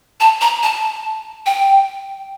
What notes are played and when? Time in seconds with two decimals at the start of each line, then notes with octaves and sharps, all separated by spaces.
0.20 A5
0.41 A#5
0.63 A5
1.46 G5